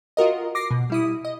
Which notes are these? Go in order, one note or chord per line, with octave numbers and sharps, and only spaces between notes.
F4 F#4 A#4 D#5
D6 A#6 C7
B2
G3 E4 D#6
D#5